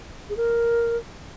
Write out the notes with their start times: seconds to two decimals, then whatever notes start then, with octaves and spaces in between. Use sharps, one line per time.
0.29 G#4
0.37 A#4